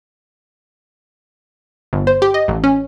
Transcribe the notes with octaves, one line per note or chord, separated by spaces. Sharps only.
G1
C5
G4
D#5
A1
C#4